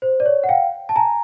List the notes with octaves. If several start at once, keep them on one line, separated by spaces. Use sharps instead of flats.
C5
D5
C#5
F#5
F5 G5
A5
G#5 A#5